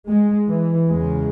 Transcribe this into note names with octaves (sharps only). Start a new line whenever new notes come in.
G#3
E3
E2 C#3 G#3